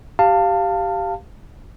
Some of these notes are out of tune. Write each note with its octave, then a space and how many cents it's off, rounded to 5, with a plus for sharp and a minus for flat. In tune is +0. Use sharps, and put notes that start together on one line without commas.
G4 -5 F5 +0 A5 +25